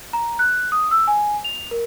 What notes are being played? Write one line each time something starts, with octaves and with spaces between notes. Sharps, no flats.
A#5
F#6
D#6
E6
G#5
F7
A#4